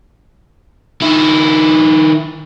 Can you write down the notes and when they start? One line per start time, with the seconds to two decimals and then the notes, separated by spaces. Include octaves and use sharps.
1.01 D#3 E4